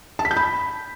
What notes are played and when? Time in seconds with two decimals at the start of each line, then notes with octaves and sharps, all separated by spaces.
0.19 A5
0.25 B6
0.31 G6
0.37 B5